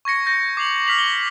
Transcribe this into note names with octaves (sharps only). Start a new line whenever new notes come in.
C#6 G#6 A#6 C#7
G6 A#6
D6 C7 F7 F#7
F6 B6 F7 F#7
G7